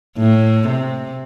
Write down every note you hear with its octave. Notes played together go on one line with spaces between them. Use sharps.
A2
C3